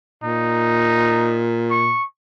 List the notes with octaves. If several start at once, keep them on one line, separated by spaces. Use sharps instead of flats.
A#2 D#4
C#6